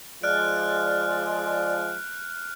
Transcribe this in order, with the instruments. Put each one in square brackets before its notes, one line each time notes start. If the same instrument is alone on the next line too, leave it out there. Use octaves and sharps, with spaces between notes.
[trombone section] F3 G#3 [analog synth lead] D5 [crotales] F6 F#6 D7